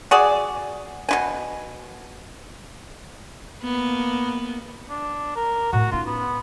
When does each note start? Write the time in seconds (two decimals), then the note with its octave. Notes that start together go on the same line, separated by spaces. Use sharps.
0.11 F#4 G#4 D5
1.09 B2 E4 G#5
3.63 A#3 B3
4.90 D4
5.36 A#4
5.73 A2 F#4
5.92 C#4 D#4 F4
6.06 B3